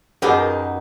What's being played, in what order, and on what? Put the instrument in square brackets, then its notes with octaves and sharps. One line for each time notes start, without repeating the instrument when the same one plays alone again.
[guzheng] F#2 D#4 [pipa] B2 B3 G4 [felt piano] G#4 A#4 B4